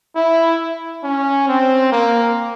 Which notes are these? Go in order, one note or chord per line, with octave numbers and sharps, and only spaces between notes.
E4
C#4
C4
A#3